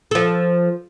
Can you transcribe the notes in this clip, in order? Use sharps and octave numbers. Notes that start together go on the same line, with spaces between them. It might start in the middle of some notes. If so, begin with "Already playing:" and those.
F3 A4